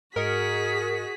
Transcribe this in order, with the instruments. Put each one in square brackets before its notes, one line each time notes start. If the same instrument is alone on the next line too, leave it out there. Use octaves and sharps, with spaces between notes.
[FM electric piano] G#2 D#5 C#7 [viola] F#4 G#4 [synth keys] A#4 [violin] B6